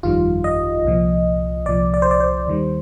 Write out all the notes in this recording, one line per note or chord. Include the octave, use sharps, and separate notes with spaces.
G1 F2 D#3 G3 F4
D#5
C2 A#2 F3
C2 A#2 F3 D5
D5
C5
D5
C5
D#2 D#3 G3